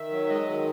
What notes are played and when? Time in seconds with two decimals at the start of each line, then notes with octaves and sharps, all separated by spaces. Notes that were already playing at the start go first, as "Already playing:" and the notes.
Already playing: D#3 E5
0.11 F#3
0.28 G#3 D#5
0.46 D#3